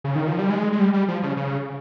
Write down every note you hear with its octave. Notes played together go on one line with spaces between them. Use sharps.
C#3
D#3
F3
G3
G#3
G#3
G3
G3
F3
C#3
C#3